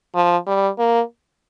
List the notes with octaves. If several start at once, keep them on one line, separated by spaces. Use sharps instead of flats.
F3
G3
A#3